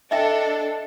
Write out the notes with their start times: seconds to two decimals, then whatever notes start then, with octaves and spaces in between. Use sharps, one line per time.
0.11 D4 A4 D#5 E5 G5